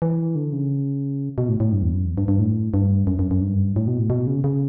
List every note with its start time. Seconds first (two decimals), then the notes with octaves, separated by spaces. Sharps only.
0.02 E3
0.35 D3
0.53 C#3
1.38 B2
1.49 A2
1.60 A2
1.72 G2
1.82 E2
1.94 F#2
2.05 E2
2.18 G2
2.28 G2
2.39 A2
2.74 G2
3.07 F#2
3.19 F#2
3.31 F#2
3.42 G2
3.76 A2
3.87 B2
3.99 A2
4.10 B2
4.27 C#3
4.44 C#3